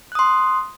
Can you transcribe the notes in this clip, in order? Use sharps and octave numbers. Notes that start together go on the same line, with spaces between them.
C6 D#6 F#6